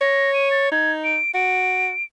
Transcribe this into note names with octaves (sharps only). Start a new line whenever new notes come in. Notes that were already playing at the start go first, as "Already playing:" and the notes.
C#5 A#6
D#7
A6
D#4 G#6
D7
F#4 D7